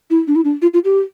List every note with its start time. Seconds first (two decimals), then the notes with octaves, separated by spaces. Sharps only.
0.10 E4
0.27 D4
0.36 E4
0.44 D4
0.62 F4
0.74 F4
0.85 G4